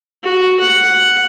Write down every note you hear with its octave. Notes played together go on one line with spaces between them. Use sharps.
F#4
F#5